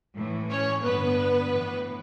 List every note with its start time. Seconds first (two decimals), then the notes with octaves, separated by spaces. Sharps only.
0.17 A2 E3
0.49 C#4 C#5
0.82 G2 D3 B3 B4
1.48 A2 E3